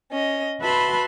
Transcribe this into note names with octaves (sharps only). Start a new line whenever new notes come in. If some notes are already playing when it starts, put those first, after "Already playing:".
C#4 D#5
F#4 B4 E5 A5 B5 C6